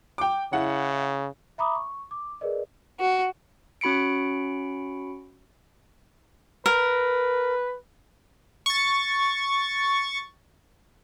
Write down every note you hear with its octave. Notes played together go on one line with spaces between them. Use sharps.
G5 D6
C#3 E4 F#5
E5 A#5 B5 D6 D#6
C#6
D6
G#4 A#4 B4 D5 D#5
F#4
C#4 F#4 B5 C#7 D7
A#4 B4
C#6 A6